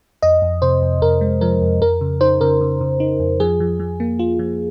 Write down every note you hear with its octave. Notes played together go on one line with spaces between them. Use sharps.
F2 D#5
F2
C3 C5
F2
F2 A#4
G#3
F3 A#4
F2
F2 A#4
C#3
D#4 C5
C#3 A#4
C#3
C#3
D#4
F2
F3 G#4
F3
F3
A#3
F4
F3